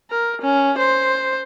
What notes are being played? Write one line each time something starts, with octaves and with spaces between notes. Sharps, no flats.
A#4
C#4
C5